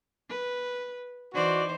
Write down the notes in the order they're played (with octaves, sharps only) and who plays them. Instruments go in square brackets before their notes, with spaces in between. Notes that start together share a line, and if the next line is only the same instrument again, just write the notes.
[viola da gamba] B4
[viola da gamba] E3 D#4 C5 [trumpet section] F#4 D5